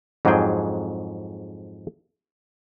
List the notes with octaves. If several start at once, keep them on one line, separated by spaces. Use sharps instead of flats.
F2 G#2 F#3 D4 G#4 G5